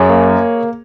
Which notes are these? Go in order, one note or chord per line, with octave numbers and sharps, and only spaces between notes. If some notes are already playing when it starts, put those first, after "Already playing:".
Already playing: F#2 G#4 C#5
A#3